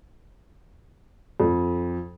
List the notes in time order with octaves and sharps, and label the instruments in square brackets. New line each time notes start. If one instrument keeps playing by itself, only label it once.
[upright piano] F2